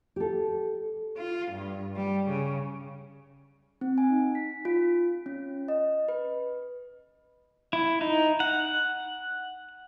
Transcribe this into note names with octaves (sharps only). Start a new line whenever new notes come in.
G4 A4
F4
G2
G3
C#3
C4
G#5
D#4
B6
F4
C#4
D#5
B4
E4
D#4
F#5